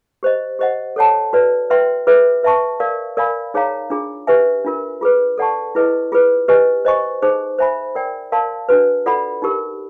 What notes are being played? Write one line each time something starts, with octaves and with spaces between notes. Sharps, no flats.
G4 C5 D#5
G4 C5 D#5 F#5
A4 C#5 F#5 A5
F#4 B4 D5
B4 E5 G5 C6
F4 G#4 B4 E5
B4 E5 A5 C#6
A#4 D5 F5
A#4 D5 F5 G#5 B5
D#4 G#4 C#5 F5 A#5
D4 F4 G#4
G4 B4 E5 G#5
D4 F4 A#4
F4 G#4 B4
A4 D5 F#5 A5 C#6
E4 G#4 B4 D#5
F4 G#4 B4
G4 B4 D#5 G#5
C5 D#5 G#5 C#6
D#4 G#4 C5
C5 E5 G#5 B5
A#4 D5 G5
A#4 D5 F5 A5 C6
D4 F#4 B4
F4 A4 D5 F#5 B5
D#4 G4 A#4